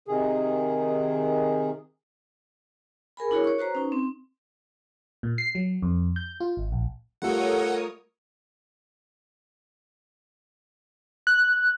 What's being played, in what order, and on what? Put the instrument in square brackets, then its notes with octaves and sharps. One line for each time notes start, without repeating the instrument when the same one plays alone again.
[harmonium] C3 D#3 G#4
[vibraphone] G#4 A#4 G#5 B5
D4 E4 F#4 G#4 A#4 C#5
C#5 C#6
F#4 B4 C5 A#5
C#4 D#4
C4
[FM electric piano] A#2
C7
F#3
F2
G6
F4
G#1
A#1
[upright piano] G3 A3 F4 [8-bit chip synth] A4 F#5 [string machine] A#4 C#5 D#6
[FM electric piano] F#6